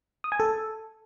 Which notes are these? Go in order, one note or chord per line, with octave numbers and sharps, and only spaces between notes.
D#6
G#5
A4